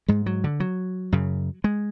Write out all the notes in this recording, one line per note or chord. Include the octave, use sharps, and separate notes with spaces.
G#2 G#3
F#3
D3
F#3
F#2 C#3
G#3